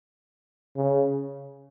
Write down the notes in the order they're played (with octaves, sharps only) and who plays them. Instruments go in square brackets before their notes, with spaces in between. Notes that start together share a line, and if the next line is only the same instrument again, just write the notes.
[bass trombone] C#3